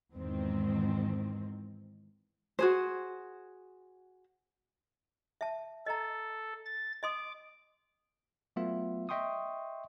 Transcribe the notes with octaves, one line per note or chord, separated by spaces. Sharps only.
E2 G#2 D#3 C4
F#4 G#4 C5
E5 A5
A4 D#5 A#5
A6
D#5 C6 D6 D#6
F#3 A3 B3 F4 E5
D#5 E5 G5 C6 C#6 D#6